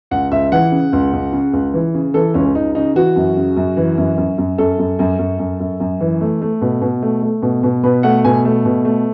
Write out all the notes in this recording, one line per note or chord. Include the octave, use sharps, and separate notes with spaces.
C#2 F#5
C#2 E5
E3 F#5
C#3
C#2
C#2
C#3
C#2
E3
C#3
E3 A4
C#2 C#4
C#2 D#4
C#3 D#4
E3 F#4
F#2
C#3
F#2
E3
F#2
F#2
F#2
F#2 A4
F#2
F#2
F#2
F#2
F#2
F#2
E3
A3
A3
B2
B2
A3
A3
B2
B2
B2 B4
A3 F#5
B2 G#5
A3
B2
A3